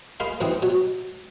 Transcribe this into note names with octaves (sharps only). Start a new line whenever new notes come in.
G#3 A#3 F5 B5 C6
F2 G#2 E3 G#3 B3 C4
B2 F#3